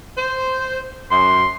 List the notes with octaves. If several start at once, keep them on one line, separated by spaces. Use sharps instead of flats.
C5
F#2 C6